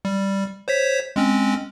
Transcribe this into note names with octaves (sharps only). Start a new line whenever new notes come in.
G3
C5 C#5 B6
G#3 C4 C#4